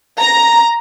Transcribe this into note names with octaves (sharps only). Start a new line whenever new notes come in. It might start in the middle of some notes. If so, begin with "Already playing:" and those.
A#5